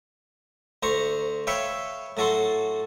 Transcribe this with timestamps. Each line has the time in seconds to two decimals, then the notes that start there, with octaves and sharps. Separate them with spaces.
0.83 D2 C5 A#5 C#6
1.47 B4 C#5 E5 F5 G5 C#6
2.17 A2 F#3 F#4 A4 C6